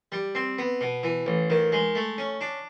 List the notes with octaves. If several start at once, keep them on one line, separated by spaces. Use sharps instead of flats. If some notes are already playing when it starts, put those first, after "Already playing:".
G3
C4
B3
B2
E3
A1
D#3
G#3
A3
C#4
D4